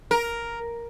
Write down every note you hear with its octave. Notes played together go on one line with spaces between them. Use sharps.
A#4